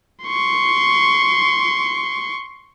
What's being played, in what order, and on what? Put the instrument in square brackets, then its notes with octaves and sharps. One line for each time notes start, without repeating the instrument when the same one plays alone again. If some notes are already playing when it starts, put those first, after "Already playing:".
[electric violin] C6 C#6